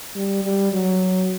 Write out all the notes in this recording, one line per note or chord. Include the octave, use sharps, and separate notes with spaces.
G3
G3
F#3